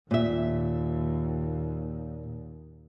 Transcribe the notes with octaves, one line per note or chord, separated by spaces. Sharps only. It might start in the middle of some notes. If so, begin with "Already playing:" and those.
D#2 A#2 E5